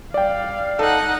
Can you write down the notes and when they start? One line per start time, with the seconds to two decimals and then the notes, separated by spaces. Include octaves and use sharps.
0.14 G3 D5 F5 G5
0.79 D#4 A4 F#5